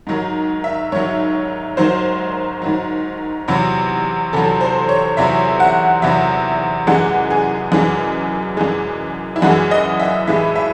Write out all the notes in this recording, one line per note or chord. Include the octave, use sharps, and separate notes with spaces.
G#2 D#3 F#3
E5
G#2 D#3 F#3 C#5
G#2 D#3 F#3 C5
G#2 D#3 F#3
E2 C3 F#3
E2 C3 F#3 A4
C5
C#5
E2 C3 F#3 E5
F#5
E2 C3 F#3 E5
F#2 E3 G#3 F#5
G#4
F#2 E3 G#3
F#2 E3 G#3
E4
F#2 E3 G#3 F#4
D#5
E5
A2 E3 G#3 E5
E5